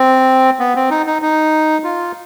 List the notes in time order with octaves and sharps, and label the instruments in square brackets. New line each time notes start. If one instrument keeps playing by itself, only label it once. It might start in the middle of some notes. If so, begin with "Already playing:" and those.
Already playing: [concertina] C4
B3
C4
D#4
D#4
D#4
F4